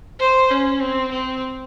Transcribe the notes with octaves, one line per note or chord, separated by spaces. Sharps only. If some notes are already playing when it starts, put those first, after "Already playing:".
C5
C#4
C4
C4